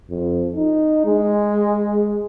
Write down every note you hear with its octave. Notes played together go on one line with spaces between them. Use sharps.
F2
D#4
G#3